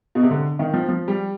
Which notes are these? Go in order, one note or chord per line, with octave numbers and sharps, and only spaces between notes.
B2
C3
D3
D#3
F3
F3
G3